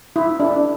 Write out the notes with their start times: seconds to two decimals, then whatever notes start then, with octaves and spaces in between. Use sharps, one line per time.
0.16 E4
0.40 D4